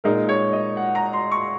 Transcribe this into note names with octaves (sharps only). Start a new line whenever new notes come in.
A#2 G#3 D#4 A#4
C#5
D#5
F#5
A#5
C6
C#6